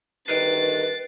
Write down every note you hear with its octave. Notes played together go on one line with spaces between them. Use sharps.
D2 G2 D#3 B4 A6 C7 D7